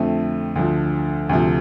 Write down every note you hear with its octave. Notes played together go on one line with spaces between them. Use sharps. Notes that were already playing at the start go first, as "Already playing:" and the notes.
Already playing: F2 D3 A3 C4
D2 D3 F3
D2 C3 F3